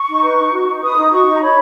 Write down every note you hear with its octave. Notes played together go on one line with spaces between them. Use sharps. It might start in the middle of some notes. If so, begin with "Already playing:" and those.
Already playing: C#6
D#4
B4
D#4
F#4
D#4
B4 D#6
D#4
F#4 C#6
D#4
A#5
C#5 B5